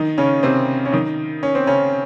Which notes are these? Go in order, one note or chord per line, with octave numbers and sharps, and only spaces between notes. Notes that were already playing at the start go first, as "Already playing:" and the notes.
Already playing: D#3 D#4
C#3 C#4
C3 C4
C#4
D#3 D#4
C#4
C4
C#3 C#4